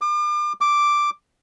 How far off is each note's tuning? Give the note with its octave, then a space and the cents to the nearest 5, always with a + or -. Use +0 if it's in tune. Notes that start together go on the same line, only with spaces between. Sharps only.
D6 +35
D6 +0